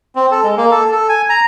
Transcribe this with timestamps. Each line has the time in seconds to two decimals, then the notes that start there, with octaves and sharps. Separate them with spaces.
0.15 C4
0.31 A4
0.43 G#3
0.57 A#3
0.71 A4
0.91 A4
1.09 G#5
1.29 A#5